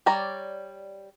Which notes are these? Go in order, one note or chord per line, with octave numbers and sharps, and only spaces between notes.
G3 C#5 D5 A#5